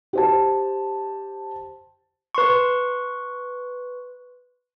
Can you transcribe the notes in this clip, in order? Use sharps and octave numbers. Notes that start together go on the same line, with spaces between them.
G4 C5 A5
B4 C6 C#6